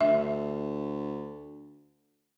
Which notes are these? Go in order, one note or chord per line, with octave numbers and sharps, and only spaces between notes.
D2 E5